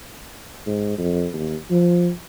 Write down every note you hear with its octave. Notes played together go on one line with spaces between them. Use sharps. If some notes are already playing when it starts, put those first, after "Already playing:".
G#2
F2
D#2
F3